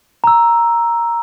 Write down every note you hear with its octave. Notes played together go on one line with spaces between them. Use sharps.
A#5 E6